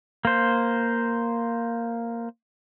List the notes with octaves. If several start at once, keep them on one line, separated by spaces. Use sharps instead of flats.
A#3 C5